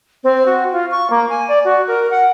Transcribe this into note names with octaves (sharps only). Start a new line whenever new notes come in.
C4
F#4
F4
C#6
A#3
G#5
D5
F#4
A#4
F#5